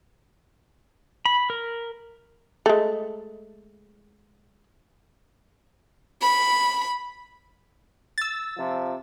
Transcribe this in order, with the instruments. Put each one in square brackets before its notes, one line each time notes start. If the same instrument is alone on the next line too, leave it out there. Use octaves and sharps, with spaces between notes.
[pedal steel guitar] B5
A#4
[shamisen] G#3 A3
[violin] B5
[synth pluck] E6 A6
[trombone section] C3 F3